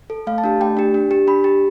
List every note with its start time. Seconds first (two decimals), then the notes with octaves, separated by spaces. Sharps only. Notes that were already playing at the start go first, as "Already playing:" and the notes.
0.10 A4
0.27 A3 F5
0.38 A5
0.44 D4 G4
0.61 A3 G5
0.77 D4 G4
0.94 D4
1.11 G4
1.27 D4 B5
1.44 G4